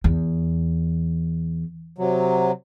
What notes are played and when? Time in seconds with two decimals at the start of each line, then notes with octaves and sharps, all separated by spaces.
0.04 E2
1.98 C3 F#3